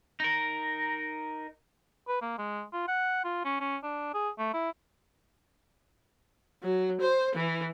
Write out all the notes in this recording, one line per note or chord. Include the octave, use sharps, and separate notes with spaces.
D#4 A#4
B4
A#3
G#3
F4
F#5
F4
C#4
C#4
D4
G#4
A3
E4
F#3
C5
E3